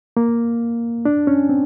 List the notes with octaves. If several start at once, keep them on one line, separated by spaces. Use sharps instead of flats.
A#3
D4
C#4
C4